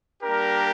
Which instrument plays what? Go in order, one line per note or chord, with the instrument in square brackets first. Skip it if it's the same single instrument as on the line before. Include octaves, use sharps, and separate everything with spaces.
[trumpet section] G3 A#3 D4 G4 A#4